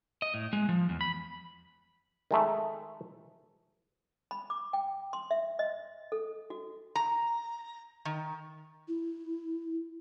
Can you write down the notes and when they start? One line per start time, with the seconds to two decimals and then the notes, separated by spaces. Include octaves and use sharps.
0.22 D#5
0.34 A2
0.53 G#3
0.69 F3
0.89 E2
1.01 B5
2.31 D#3 G#3 A3
4.31 B5
4.50 D6
4.73 G5
5.13 C6
5.31 E5
5.59 D#5
6.12 A4
6.50 F#4
6.96 A#5
8.05 D#3
8.88 E4